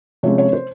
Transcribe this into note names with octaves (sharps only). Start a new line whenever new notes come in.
C3 F3 G#3 C#4 C#5
C#5
C5